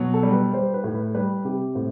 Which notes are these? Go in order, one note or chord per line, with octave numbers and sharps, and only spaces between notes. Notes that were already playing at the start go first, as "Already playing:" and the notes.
Already playing: B2 F#3
A4
G3
B4
G3 C5
B4
A2
B4
G3 B4
C3 G4
A2 C4